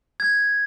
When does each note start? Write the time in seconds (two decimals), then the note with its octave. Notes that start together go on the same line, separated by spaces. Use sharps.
0.20 G#6